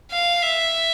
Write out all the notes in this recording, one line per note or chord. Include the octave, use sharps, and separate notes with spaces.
F5
E5